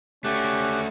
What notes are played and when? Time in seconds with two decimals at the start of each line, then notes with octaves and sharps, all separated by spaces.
0.24 A3 C#4 F#4 G4 F#6